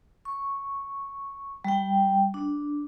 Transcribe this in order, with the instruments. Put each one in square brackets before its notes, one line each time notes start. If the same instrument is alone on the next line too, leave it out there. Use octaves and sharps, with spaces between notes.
[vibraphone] C#6
G3 G5
D4